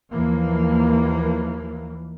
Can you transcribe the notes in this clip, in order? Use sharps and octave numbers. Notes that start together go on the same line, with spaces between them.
D#2 E3 F3 A#3